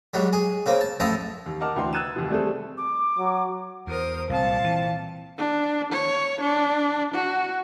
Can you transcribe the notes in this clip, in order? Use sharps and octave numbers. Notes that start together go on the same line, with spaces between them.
G#2 F#3 G3
G#4
C#3 A#3 C4
A5
A1 F3 E4 F4 D#5 A5
D#2
A#4 D#5 F#5 A5 D6 F6
D2 E3 G5 C6
E6 F#6 G#6 A6 D#7 E7
F1 D#2
G3 A3 C4 G#4 A4
D6
F#3
E2 A#4 C5 D#6
C2 A#2 C4 F5 A5
E3
D4
C#5
D4
F#4